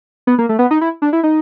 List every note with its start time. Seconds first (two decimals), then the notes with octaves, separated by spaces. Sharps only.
0.27 B3
0.38 A#3
0.49 A3
0.59 B3
0.71 D#4
0.81 E4
1.02 D4
1.13 E4
1.23 D#4